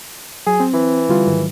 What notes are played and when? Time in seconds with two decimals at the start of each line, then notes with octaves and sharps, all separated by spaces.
0.47 F#3 G#4
0.60 C4
0.73 E3
1.09 D3 G3 F4
1.27 G#2 D#3 F#3